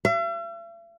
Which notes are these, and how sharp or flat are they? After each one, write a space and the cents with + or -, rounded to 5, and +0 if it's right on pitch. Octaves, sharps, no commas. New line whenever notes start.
E5 +45